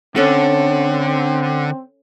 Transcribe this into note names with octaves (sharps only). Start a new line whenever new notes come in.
D3 C4 C#4 A4